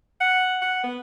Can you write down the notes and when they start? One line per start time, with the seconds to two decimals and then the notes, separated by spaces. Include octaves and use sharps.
0.21 F#5
0.62 F#5
0.83 B3